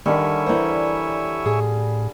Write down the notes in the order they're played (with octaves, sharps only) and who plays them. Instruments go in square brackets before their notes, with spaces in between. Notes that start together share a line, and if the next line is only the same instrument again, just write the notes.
[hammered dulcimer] D3 G3 [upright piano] D#3 [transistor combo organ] C#5 E5 G#5
[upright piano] E3 A#4 C5
[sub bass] A2 [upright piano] G#4